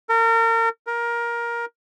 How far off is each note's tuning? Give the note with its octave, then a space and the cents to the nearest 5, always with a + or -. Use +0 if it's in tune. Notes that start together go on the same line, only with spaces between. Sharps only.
A#4 -35
A#4 +15